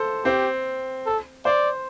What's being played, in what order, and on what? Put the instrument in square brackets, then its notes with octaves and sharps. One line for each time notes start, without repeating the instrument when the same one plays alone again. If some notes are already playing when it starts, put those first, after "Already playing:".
Already playing: [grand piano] A4 C5
[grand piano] C4 [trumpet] G4
[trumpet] A4
[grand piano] C5 [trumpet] D5